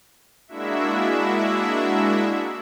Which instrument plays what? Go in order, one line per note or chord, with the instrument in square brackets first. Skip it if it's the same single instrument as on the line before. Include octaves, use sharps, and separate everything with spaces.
[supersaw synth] G#3 A#3 D4 E4 F#4 E5